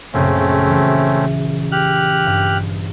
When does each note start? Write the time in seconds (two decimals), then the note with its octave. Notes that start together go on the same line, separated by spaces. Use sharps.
0.13 A#1 F#2 C#3 A3 C4 C#4
0.68 E3
1.72 G4 F6 F#6
2.26 G2